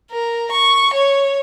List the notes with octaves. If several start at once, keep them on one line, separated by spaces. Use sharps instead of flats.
A#4
C#6
C#5